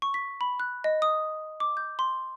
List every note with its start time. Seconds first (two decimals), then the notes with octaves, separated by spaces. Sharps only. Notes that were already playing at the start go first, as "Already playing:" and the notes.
0.02 C#6
0.14 B6
0.41 B5
0.60 F#6
0.84 D#5
1.02 D#6
1.60 D6
1.77 G6
1.99 C6